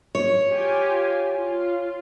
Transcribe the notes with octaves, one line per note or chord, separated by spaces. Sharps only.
C#5
F4 G4 G#5
F4